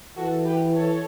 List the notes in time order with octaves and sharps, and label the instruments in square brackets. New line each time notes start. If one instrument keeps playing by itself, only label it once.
[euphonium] E3 [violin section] F#4 A4
[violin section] G4 B4
A4 C#5